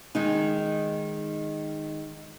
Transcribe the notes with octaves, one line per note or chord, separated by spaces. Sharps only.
D#3 G#3 D#4